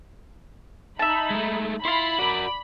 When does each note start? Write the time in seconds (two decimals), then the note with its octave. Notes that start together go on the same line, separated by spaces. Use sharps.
0.99 D#4 E5 A5 B5
1.30 G#3 A3
1.85 E4 F4 B5 C6
2.19 F#4 A#4 D5